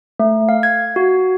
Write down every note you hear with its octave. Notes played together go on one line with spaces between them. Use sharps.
A3
F5
G#6
F#4